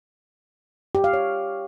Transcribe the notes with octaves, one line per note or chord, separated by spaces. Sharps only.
G4
F5
C#5